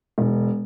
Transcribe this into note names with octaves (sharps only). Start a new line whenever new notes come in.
E1